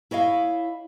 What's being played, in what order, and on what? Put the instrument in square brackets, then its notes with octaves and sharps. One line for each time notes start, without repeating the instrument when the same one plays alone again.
[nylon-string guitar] E4 C#5 D#5 F5